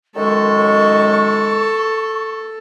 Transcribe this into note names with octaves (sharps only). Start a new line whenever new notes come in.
F#2 D#3 G#3 A4 C#6